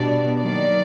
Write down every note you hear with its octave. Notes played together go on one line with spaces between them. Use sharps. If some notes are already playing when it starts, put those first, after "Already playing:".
Already playing: B2 G3 B3 D4 D5
D#3 F#3 A#3 D5